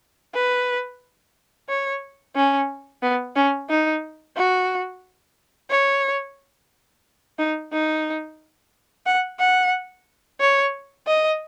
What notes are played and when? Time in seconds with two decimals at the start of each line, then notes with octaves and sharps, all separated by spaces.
0.34 B4
1.69 C#5
2.36 C#4
3.03 B3
3.36 C#4
3.70 D#4
4.37 F#4
5.71 C#5
7.38 D#4
7.72 D#4
9.06 F#5
9.40 F#5
10.40 C#5
11.07 D#5